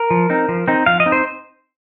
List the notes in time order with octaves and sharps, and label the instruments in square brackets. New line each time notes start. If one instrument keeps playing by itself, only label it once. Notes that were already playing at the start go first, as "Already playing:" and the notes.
Already playing: [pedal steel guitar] A#4
F3
C4 D#4
F3
C4 D#4
F3 F5
D#5
C4 D#4
C5